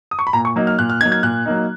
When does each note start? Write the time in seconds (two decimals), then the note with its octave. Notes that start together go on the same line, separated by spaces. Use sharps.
0.11 D#6
0.19 C#6
0.27 B5
0.33 A#2 A#5
0.45 C#6
0.56 F#3 A#3 D#4
0.67 F6
0.79 A#2 F#6
0.90 F6
1.01 F#3 A#3 D#4 G#6
1.12 G#6
1.23 A#2 F#6
1.46 F#3 A#3 D#4